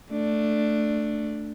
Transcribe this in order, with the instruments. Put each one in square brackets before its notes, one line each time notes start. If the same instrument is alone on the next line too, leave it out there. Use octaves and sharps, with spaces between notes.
[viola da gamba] A3 D4